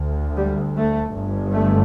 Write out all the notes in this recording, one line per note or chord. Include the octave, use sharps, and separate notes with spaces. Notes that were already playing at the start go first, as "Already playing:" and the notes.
Already playing: D2
G3
A3
G1 G2
A3